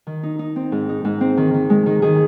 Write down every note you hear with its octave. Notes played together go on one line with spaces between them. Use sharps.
D#3
D#4
D#4
C4
G#2
D#4
G#2
C4
D#3
D#3
G#3
D#3
D#3 G#4